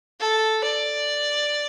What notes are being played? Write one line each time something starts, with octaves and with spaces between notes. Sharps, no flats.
A4
D5